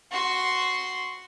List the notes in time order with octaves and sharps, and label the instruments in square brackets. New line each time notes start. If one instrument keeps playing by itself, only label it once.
[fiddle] F#4 C6